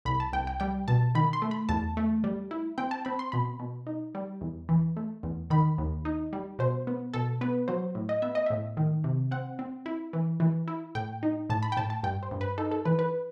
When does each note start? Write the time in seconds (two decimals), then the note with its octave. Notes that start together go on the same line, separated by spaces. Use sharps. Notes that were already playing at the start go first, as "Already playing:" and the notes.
0.05 C2 B5
0.20 A5
0.33 C2 G5
0.47 G5
0.60 G3 G5
0.88 B2 A5
1.15 D#3 B5
1.33 C6
1.42 A3
1.51 B5
1.69 E2 A5
1.97 A3
2.24 G3
2.51 E4
2.78 C4 G5
2.91 A5
3.05 C4 B5
3.19 C6
3.32 B2 B5
3.60 B2
3.87 D#4
4.15 G3
4.41 E2
4.69 E3
4.97 A3
5.23 E2
5.50 D#3 B5
5.78 D#2
6.05 D#4
6.33 G3
6.59 B2 C5
6.87 B3
7.14 B2 A4
7.41 B3 B4
7.68 F#3 C5
7.95 A2
8.09 D#5
8.22 B3 E5
8.35 D#5
8.46 A2 E5
8.77 D#3
9.04 C3
9.31 C4 F#5
9.59 C4
9.86 E4
10.13 E3
10.40 E3
10.68 E4
10.95 A2 G5
11.23 D#4
11.50 A2 A5
11.63 B5
11.72 G5
11.77 A2 A5
11.90 A5
12.03 G2 G5
12.23 C5
12.31 G2
12.41 B4
12.58 D#4 A4
12.71 A4
12.85 E3 B4
12.99 B4